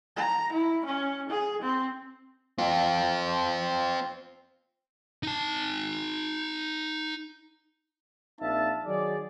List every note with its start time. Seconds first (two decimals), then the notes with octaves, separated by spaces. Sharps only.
0.16 A#5
0.53 E4
0.85 C#4
1.29 G#4
1.62 C4
2.58 C4 F4
5.23 D#4 A5
8.40 A#1 C4 D#4 E5 F5 A5
8.85 D#3 F#3 D#4 G#4 D5